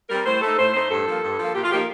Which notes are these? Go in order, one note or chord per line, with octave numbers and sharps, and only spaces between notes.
G3 C4 A#4
A2 C5
A3 D#4 A4
A2 C5
A3 D#4 C5
G2 A4
F3 A#3
G2
F3 A#3
A#2 G4
F4
F3 A#3 D#4 G4